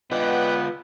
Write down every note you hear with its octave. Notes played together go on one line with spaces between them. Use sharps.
B3 F4 B4 D5 D#5 F#5 G5